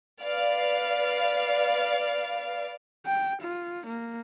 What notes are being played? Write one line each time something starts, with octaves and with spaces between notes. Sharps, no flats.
B4 D5 F5
G5
F4
A#3